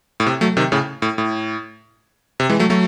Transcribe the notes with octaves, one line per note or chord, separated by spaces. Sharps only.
A2
C3
F#3 A3
C3 D#3
A2 C#3
A2
A2
C3
E3 G#3
F#3 A3
F#3 A3